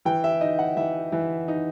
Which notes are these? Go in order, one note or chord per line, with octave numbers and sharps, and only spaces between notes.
E3 G5
E5
D#4 D#5
F#5
E3 E5
E3
D#4